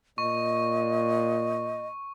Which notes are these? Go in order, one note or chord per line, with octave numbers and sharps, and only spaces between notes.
A#2 D#5 C#6